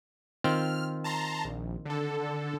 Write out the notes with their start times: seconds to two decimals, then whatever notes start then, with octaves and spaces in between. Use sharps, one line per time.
0.44 D#3 C4 F4 F6
1.04 A5 A#5 C6
1.45 A#1
1.85 D3 A4